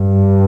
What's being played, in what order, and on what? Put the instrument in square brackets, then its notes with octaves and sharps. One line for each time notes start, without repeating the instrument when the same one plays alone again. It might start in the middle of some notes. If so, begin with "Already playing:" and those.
Already playing: [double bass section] G2